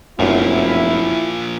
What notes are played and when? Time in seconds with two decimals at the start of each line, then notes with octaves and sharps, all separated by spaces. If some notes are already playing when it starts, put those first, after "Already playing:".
0.19 F1 F#2 A#2 F3 E4